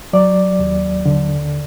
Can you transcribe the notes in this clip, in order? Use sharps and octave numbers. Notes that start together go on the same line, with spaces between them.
F#3 D5
D#2
D3